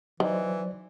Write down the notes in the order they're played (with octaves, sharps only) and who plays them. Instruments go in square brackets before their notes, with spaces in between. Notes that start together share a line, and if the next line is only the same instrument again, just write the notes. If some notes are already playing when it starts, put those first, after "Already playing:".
[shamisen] D#3 [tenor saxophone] E3 [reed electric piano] F#3 C5 D5